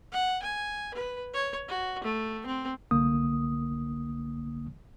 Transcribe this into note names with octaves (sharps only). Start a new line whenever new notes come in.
F#5
G#5
B4
C#5
F#4
A3
C4
C2 D3 A#3 D#6